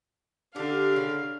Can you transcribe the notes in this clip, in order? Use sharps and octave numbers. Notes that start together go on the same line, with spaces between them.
D3 G4 F5
C#3